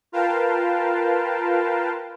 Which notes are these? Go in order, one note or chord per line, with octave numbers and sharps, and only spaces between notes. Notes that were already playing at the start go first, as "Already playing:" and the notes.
F4 A#4 B4 F5 G5 A5